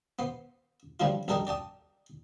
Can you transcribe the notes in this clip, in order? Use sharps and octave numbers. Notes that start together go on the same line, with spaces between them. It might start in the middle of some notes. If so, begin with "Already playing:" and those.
B3 C5
A2 D3 F3 G3 E4 F4
A#1 G3 A4 A#4 D#5 G5
D5 G5 A5 D#6